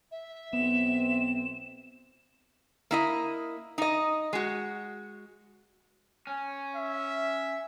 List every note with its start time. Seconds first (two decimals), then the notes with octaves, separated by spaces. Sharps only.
0.11 E5
0.53 B1 B3 C4 E7
2.91 A#3 E4 D#5
3.78 D#4 D#5
4.33 G#3 F#4
6.27 C#4
6.76 E5